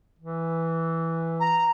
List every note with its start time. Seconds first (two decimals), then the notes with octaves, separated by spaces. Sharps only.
0.19 E3
1.40 A#5